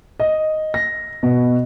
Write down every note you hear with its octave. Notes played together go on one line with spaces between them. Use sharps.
D#5
A#6
B2